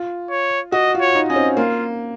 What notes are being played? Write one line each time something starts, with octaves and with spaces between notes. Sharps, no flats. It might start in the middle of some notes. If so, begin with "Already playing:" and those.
Already playing: F4
C#5
F#4 D#5
F4
C#5
D#4
C#4 D#5
C4
A#3 F4